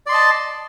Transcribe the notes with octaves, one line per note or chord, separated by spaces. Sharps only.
D5 D#5 A5 C6